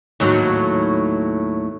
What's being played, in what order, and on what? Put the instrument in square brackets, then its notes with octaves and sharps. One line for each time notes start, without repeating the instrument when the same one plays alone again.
[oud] D#2 A2 F#3